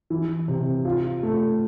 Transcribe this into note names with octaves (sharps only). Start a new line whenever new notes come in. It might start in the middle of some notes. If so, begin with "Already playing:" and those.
E3
C3
F4
A3